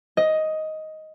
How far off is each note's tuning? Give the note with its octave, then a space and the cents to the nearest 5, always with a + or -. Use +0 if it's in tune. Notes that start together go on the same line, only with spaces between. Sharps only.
D#5 +10